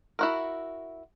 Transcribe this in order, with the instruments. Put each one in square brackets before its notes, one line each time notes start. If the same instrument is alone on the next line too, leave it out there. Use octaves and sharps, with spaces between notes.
[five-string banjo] E4 F#4 A#4